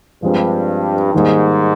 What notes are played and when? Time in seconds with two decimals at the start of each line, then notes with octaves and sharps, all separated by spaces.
0.22 G2 F3 G#3 C4
1.13 G#2 D#3 G3 A#3